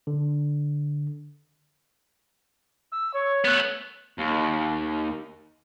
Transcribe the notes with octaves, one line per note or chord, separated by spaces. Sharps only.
D3
E6
C#5 C#6
A3 B3 F#6
D#2